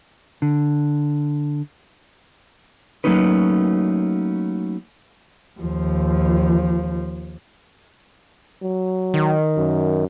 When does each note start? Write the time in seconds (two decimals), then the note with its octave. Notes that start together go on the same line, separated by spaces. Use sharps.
0.42 D3
3.04 F#3 A3 A#3 C#4 D#4 B4
5.60 D#2 F3
8.62 F#3
9.14 D#3
9.57 F#2